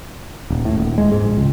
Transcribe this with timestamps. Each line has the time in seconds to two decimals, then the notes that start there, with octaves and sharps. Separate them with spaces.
0.50 D#1
0.65 A2
0.78 D#1
0.98 G#3
1.11 G#2
1.24 A#1
1.37 C#2